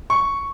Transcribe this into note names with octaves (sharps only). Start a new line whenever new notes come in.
C#6